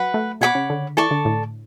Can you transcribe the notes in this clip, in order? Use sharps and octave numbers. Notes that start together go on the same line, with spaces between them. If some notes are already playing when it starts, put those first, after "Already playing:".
Already playing: F#3 B4 F#5 B5
A3
B2 C#5 F#5 B5 D6
C#3
D3
E3 A4 D5 A5 C#6
D3
A2